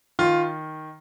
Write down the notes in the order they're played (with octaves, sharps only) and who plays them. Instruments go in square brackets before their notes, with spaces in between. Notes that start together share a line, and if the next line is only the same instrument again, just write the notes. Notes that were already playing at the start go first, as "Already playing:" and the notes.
[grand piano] D#3 F4